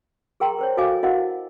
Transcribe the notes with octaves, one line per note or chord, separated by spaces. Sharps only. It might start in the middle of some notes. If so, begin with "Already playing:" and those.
G#4 A#4 G5 A#5 C6
A#4 C5 C#5
F#4 A4 D#5 F5 G#5 D6
E4 F#4 A#4 D#5 F5 F#5